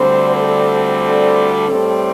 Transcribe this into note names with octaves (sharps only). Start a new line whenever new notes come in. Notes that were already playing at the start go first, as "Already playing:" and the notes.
Already playing: D2 D3 G3 C4 C5
A4
A2 G3 C4